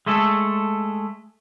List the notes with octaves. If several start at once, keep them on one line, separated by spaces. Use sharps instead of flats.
G#3 A3 A4